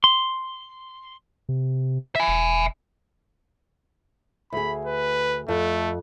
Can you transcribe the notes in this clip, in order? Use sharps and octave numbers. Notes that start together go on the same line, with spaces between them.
C6
C3
E5 G#5
E1
D2 G#4 B5
B4
F2 A3